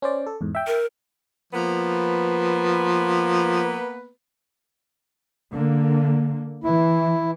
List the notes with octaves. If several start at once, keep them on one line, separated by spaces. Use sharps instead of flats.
C#4 C5 D5
A4
E2 G#2
E5 G5
A#4
F3 A#3 B3 B4
D3 A#3
E3 E4